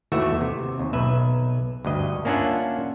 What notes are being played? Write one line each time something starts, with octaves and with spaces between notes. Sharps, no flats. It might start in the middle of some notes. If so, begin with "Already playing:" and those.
D#2 E3 A3 F#4 E5
C3
D#2
B1 B4 E5
D2 G2 D#5
A#3 C#4 D4 F4 E5 F#5